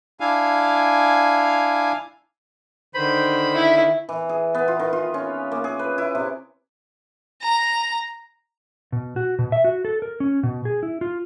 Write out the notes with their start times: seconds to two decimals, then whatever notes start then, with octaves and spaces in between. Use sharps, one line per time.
0.20 D4 E4 F5 G#5
2.95 D3 D#3 C5 B5
3.55 E4
4.09 E3
4.29 G#4
4.54 B3
4.68 F4
4.79 D#3
4.93 F4
5.14 C#4
5.52 A#3
5.64 G#4
5.79 B4
5.98 E4
6.15 C3
7.42 A#5
8.92 B2
9.16 F#4
9.39 B2
9.52 E5
9.64 F#4
9.85 A4
10.02 A#4
10.20 C#4
10.43 B2
10.65 G#4
10.83 E4
11.01 F4